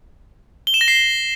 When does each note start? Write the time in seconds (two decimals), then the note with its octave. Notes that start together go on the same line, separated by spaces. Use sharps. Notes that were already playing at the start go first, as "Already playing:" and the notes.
0.67 G7
0.74 E7
0.81 A#6
0.88 C7
0.95 G7